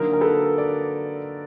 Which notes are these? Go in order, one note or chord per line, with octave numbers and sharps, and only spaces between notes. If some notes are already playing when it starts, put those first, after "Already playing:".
Already playing: D3 F#3 A#3 D#4 A#4
A#4
A4 B4
D5